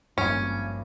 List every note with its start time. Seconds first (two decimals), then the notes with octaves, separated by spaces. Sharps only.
0.17 G#1 G2 F3 A#3 C#4